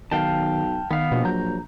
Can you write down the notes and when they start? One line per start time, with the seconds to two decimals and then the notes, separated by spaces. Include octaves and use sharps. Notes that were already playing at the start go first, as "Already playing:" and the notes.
0.11 B1 D#3 F5 G5 A5
0.91 D#3 B3 F5
1.12 A#1 B2
1.25 F#3 A#5 G6